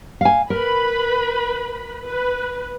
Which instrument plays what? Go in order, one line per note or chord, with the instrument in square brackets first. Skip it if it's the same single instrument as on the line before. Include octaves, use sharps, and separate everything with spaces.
[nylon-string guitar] F5 G#5
[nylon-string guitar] A#4 [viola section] B4 B5
[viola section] B4